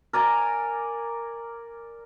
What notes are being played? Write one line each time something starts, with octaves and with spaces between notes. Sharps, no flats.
A#4 D5 G#5 A#5